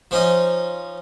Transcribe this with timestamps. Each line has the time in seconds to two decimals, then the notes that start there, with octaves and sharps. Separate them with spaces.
0.11 F3 C#4 D#4